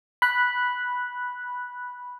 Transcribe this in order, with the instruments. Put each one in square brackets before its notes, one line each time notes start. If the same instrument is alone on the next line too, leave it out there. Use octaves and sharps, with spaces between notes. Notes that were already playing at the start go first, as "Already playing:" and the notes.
[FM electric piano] B5 F#6